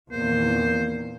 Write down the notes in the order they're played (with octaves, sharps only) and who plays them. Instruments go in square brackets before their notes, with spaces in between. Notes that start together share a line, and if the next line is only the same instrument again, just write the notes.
[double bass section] E2 A#2 D#3 [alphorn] A#3 [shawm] C5